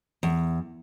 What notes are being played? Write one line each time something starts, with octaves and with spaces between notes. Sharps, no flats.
E2